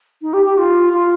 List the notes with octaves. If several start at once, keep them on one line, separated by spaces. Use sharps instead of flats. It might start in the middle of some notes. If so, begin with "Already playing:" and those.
D#4
G4
G4
F4
F4